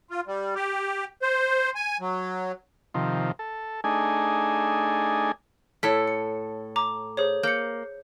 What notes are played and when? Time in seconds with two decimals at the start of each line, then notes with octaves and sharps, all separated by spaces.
0.10 F4
0.27 G3
0.55 G4
1.22 C5
1.75 G#5
2.00 F#3
2.94 C3 D#3 F3
3.39 A4
3.84 A3 D4 D#4 G#4 G#5
5.83 A2 A4 C#5 B6
6.08 C#7
6.76 A#5 D6
7.17 G#4 C5 C#5
7.43 A#3 G6 C#7